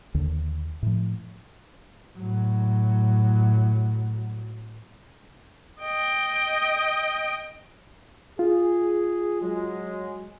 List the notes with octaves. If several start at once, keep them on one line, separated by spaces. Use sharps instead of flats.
D#2 D3
A2 F3
A2 F#3
D#5 G5
F4 G#4
F#3 G#3